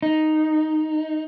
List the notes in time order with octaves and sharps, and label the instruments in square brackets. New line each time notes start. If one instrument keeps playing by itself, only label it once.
[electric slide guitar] D#4